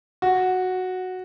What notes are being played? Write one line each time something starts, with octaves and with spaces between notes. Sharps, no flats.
F#4